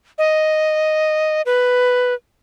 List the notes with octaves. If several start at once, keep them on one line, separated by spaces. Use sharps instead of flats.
D#5
B4